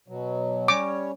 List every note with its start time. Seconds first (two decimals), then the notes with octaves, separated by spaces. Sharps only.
0.08 B2 F#3
0.68 G3 C#4 C#5 D6